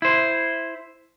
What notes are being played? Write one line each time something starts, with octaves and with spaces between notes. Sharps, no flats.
E4 C5